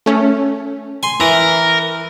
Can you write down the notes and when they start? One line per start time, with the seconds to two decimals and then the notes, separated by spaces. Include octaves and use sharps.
0.06 A3 C#4
1.03 G#5 C6
1.20 E3 A#4